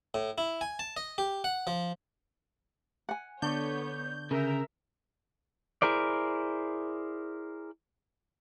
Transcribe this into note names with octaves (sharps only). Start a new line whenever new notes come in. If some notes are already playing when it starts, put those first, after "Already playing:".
A2
E4
G#5
A5
D#5
G4
F#5
F3
F#5 G#5
D3 B3 D4 C#5 G6
C#3 A#4 E5 A#5
E4 G#4 A#4 C5 D5